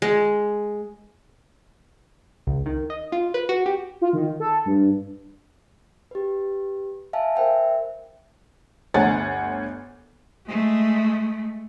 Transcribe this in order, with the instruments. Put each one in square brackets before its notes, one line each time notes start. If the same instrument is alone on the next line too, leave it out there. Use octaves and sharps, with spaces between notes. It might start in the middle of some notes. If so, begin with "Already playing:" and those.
[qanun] G#3
[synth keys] C#2
D#3
D#5
F4
B4
F#4
G4
[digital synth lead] F4
D#3
A4
G2
[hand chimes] G4 B4
E5 F5 G#5 A5
A#4 C5 E5 G5
[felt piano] G1 D2 C#5 F#5 G#5 A6
[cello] G#3 A3